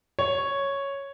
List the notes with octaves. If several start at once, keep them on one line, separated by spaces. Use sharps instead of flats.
C#5